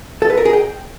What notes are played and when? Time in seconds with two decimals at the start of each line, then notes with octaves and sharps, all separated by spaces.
0.22 A4
0.30 B4
0.38 A#4
0.45 G#4
0.53 G5